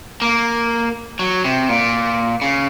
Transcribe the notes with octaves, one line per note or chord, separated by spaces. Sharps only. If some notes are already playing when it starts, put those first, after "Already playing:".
A#3
F#3
C3
A#2
C#3